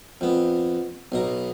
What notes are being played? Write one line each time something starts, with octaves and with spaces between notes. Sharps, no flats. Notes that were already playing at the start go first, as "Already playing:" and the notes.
F2 B3
B1 B2 A#5